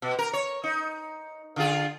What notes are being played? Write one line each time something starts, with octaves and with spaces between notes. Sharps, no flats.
B2
A#4
C#5
D#4
D3 F4 G#4